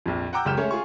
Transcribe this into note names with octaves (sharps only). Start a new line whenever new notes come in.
A#1 F2
F#5 G5 A#5 D6 E6 G6
F#1 C#2 G4 F6 G6 E7
G#3 A3 C#4 C#5
F4 G#4 C#6